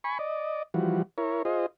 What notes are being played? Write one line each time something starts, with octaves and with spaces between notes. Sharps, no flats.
G#5 B5 C#6
D5 D#5
E3 F3 G3 F#4
E4 A#4 C#5
F4 G#4 C5 D#5